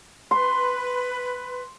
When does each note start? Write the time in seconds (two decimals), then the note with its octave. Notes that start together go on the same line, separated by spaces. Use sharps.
0.31 B4 C6